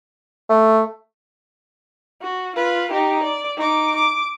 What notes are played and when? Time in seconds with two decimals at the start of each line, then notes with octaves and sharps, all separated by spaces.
0.49 A3
2.22 F#4
2.55 F4 B4
2.91 D#4 G4
3.23 D5
3.57 D#4 D6
3.96 D6